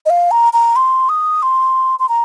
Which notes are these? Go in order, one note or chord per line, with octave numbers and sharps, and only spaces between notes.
D#5
F5
A#5
A#5
C6
D#6
C6
C6
A#5